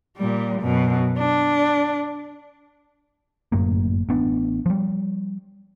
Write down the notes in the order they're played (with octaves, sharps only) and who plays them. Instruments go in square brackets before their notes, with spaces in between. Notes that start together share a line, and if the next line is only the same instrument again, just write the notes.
[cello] A#2 G3
F#2 B2
D4
[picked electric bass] G1 F#2 A2 A#3
A1 B3 D4
F3 G3